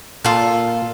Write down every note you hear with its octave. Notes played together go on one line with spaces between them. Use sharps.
A#2 F4 A4